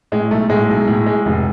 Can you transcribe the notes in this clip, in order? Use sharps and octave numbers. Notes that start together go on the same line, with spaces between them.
A2 G#3
B1 A3
A2 G#3
B1
A2
G#3
F1